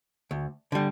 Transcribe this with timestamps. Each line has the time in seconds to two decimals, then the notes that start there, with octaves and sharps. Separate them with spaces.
0.31 D2
0.72 D3 G3